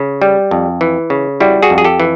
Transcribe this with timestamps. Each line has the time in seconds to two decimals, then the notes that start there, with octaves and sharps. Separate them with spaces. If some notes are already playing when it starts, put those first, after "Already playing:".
Already playing: C#3
0.22 G3
0.51 F2
0.81 E3
1.10 C#3
1.40 G3 E4 F#4
1.63 F#4 G#4
1.70 F2
1.78 G#4
1.84 G4 A4
2.00 E3